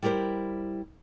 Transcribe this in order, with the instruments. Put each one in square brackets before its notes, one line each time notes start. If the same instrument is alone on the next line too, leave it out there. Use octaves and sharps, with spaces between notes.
[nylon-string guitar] G3 E4 G4 A#4 C5